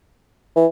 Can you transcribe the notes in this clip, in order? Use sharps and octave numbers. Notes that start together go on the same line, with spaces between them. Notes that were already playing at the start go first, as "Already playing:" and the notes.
E3